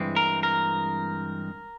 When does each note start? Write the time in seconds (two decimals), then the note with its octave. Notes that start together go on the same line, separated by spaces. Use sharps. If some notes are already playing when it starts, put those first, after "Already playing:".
Already playing: G2 E3 G#3 C4
0.16 A#4
0.43 A#4